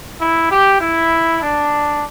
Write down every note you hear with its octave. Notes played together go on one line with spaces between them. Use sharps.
E4
G4
E4
D4